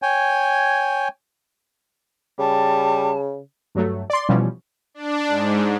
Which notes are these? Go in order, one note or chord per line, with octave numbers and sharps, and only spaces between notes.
C#5 G5 G#5
C#3 G3 A5
G2 F#3 A3
D5 C6
B2 E3 F3 G3 C#4
D4
G#2